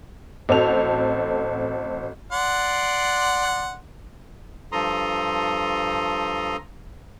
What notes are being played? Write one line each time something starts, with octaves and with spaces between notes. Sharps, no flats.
A1 C4 F#4 A4 F7
D5 F#5 C6
G2 F3 A4 A#5 C6 D#6